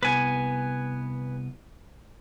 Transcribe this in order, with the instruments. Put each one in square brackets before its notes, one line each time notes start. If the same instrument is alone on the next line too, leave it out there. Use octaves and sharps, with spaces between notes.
[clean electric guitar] C2 B3 [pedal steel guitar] B4 G#5